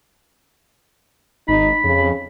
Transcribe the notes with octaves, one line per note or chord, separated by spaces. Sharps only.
G#1 D#4 B5
F2 C#3